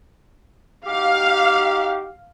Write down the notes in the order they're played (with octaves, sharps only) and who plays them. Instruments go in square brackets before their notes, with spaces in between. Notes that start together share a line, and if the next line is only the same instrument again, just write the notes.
[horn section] D#4 F#4 G4 [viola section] F5